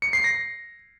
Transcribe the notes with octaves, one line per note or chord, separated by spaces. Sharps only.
C#7
C7
A#6